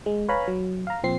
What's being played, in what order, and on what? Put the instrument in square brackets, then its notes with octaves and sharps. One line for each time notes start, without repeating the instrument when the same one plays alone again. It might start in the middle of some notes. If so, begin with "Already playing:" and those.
[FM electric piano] G#3
B4 C#5 F5 G#5 A#5 B5
F#3
F5 A#5
A#2 F3 C4 C7